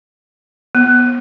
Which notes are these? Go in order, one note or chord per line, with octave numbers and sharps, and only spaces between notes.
B3